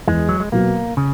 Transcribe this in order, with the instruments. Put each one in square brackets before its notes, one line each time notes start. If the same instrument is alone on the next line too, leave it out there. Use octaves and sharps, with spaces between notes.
[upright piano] E2 [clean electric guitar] G#3
[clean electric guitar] F#3
G#3
[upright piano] B2 F#3 B3 F#4 [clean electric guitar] A#3
[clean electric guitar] C#3